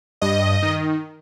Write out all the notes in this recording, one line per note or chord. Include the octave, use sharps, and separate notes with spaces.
G2 D#5
D#3